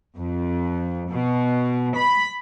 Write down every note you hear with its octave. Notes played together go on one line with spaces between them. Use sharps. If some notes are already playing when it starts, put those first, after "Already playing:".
F2
B2
B5